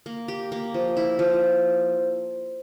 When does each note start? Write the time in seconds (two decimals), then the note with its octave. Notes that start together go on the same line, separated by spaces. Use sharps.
0.06 A#3
0.28 G4
0.52 A#3
0.74 F3
0.97 E4
1.19 F3